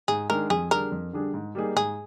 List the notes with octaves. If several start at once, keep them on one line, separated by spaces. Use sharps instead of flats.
G#2 G#4
D#3 G#3 D4 A#4
F2 G#4
D3 G3 D4 G#4 A#4
F2
D3 G3 D4 G#4
G#2
G3 A#3 D#4 G#4
G#2 G#4